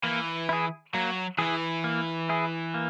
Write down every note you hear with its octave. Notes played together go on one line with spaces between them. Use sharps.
E3 A#3
E4 G#4
F#3 A#3
E3 E4 G#4
A#3
E4 G#4
A#3